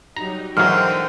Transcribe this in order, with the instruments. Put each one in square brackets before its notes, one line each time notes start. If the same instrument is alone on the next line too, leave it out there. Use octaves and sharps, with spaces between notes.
[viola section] F#3 G3 D#4 [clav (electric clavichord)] A#5
[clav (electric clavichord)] G#2 F#3 [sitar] D3 E3 A#3 [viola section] C5 G5 [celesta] F6